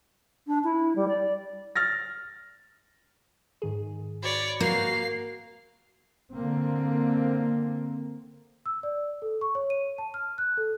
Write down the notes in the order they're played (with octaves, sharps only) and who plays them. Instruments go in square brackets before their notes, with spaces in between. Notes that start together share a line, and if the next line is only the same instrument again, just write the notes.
[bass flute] D4
E4
G3
D5
[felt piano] F6 A6 A#6
[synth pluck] G#2 D#3 G#4
[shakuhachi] F#4 [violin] C#5 D5 [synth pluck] B5
[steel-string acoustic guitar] A#3 [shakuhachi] F#4 [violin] F5 C7 [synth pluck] G6
[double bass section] D3 A#3 C4
[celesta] E6
D5
A4
C#6
C#5
D#7
A5
F6
F#6
A4